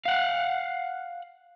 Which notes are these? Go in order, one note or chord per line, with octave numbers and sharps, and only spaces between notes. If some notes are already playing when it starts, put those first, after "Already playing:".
F5 F#5